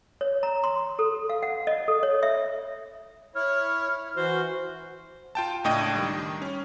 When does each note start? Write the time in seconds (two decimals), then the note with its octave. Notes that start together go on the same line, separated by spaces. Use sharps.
0.21 C#5
0.43 A#5
0.64 C6
0.99 A4
1.29 F5
1.43 F#5
1.67 D#5
1.88 A4
2.03 C#5
2.23 E5
3.35 E4 C#5 F6
4.16 E3 F#4 C5
5.35 F4 G5 A5
5.64 C#2 A2 D4 D#5 G5 D#7
5.95 D#3 G3
6.42 C#4